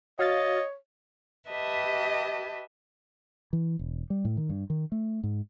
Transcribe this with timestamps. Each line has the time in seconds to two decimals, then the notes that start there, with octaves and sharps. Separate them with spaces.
0.19 F#4 C#5 D#5 F5 A6
1.50 G4 B4 D#5 E5 A5
3.53 E3
3.79 E1
4.10 G3
4.25 A2
4.37 D#3
4.49 G2
4.70 D#3
4.92 A3
5.24 G#2